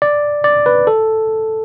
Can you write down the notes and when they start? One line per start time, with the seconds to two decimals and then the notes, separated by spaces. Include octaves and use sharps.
0.02 D5
0.44 D5
0.66 B4
0.87 A4